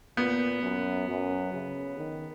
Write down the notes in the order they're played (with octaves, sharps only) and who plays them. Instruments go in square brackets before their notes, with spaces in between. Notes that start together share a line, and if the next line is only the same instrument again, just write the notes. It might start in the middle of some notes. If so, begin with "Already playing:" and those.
[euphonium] A#2 [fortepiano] B3
[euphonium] F#2
F#2
C#3
D#3